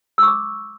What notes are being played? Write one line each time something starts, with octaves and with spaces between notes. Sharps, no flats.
C#6 D6 E6